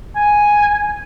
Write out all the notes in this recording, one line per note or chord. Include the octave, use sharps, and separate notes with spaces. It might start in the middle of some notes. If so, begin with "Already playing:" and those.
G#5